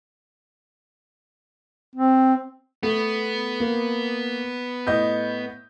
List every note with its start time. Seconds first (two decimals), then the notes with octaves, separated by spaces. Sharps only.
1.96 C4
2.83 A3 B3
3.60 A#3
4.87 A2 D#5 G6